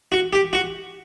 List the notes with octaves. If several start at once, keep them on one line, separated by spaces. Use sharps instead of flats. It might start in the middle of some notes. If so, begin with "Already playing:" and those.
F#4
G4
F#4